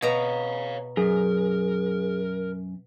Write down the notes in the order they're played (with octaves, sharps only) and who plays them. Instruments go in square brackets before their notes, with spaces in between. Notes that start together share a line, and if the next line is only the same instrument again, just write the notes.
[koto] B2 A#5 [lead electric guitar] C#5 F5
[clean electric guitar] F#2 [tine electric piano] G#4 [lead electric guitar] A#4